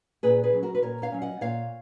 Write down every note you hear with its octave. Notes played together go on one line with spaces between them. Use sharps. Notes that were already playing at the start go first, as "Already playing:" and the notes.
A#2 G#4 B4
G#4 B4
F#3 C#4
F#4 A#4
B4
A#2 A#4 C#5
C#5 F5
F#3 C#4
D#5 F#5
A#2 C#5 F5